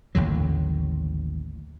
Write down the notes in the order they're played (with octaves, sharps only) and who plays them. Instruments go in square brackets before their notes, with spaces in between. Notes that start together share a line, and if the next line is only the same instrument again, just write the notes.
[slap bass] A1 D#2 D3 F#3